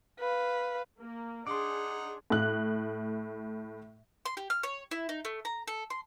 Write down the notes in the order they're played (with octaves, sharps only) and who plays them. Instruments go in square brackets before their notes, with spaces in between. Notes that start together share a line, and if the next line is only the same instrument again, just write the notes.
[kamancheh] B4 F5
[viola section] A#3
[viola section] D4 G#4 [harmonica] D#4 F#5 [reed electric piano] C6 D6
[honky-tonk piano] A2 F#6
[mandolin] C6
G4
F6
C#5
E4
D#4
A3
A#5
A4
C6